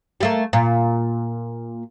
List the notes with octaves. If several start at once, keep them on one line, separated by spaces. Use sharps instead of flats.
G3 A3 A#3
A#2